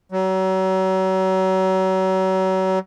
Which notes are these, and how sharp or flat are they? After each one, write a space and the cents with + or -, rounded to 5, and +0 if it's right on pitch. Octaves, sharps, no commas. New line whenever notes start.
F#3 +35